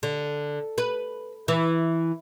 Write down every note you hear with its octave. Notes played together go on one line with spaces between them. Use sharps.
D3
B4
E3